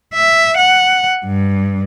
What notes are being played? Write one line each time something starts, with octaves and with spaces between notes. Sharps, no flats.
E5
F#5
G2